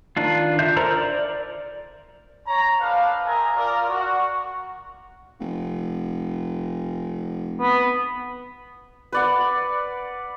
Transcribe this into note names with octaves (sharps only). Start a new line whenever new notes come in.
D#3 D4 F4
D3 F4 E5 G6
A4 A#4 C5 D5 A#5
D5
C#5 A#5
D4 A4 B4 C5 F5
C4 G#4 A#4 E5 G#5 A#5
F4 A#4 D5
F#4
F1
B3
B4 D5 F#5